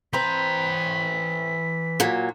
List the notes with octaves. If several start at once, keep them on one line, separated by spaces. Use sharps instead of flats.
E3 C4 B4 A#5 B6
A#2 F#3